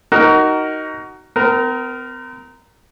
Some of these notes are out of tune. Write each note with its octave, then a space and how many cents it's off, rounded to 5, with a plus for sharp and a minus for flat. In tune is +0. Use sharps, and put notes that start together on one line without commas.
D#4 +5 F#4 +25 A#4 +0
C4 -45 A#4 +0